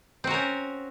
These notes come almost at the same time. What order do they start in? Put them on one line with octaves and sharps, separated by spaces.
C4 F#4 A#4 C#4